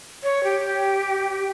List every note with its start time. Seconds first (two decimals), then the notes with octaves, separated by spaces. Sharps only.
0.23 C#5
0.44 G4